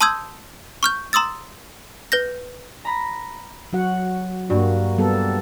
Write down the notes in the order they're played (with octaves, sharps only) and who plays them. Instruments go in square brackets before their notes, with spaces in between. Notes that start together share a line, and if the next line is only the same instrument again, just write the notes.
[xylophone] A5 C6 D#6 E6 G6 G#6
C#6 F6 G6
A#5 C6 D#6 E6 A6
B4 G6 A#6
[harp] A#5 B5 A#6
[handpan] F#3 F#4 F#5
[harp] G2 [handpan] A#3 F#4
[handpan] G3 B3 A4